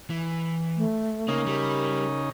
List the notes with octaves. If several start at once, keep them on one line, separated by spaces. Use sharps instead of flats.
E3
A3
C#3 A#3 D#4
G3 A#4